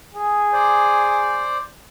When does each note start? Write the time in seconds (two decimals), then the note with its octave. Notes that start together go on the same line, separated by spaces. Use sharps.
0.15 G#4
0.53 C5 D5